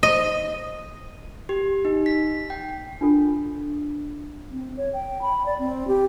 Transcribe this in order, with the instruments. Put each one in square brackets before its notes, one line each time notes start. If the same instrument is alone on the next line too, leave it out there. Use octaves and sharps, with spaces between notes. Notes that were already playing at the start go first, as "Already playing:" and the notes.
[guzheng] D#5
[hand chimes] G4
D#4
B6
G5
[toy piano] D4 F4 A4
[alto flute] C4
C#5
G5
B5
D5
C4
G4